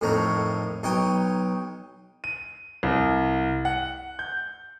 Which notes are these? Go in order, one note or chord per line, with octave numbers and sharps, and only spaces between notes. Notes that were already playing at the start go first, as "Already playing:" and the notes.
F2 A2 D#3 C#5 A#5
B1 D#4 C#5 G5
D#7
C2
F#5
G6